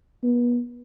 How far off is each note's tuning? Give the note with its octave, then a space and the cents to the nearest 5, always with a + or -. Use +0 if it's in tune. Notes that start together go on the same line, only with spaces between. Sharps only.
B3 -35